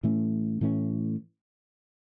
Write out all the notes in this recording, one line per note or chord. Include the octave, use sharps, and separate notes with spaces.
A2 E3 A3 C#4
A2 E3 A3 C#4